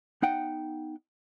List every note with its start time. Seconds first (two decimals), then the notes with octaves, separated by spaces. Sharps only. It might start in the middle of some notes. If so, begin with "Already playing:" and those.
0.22 B3 D#4 F#5 G5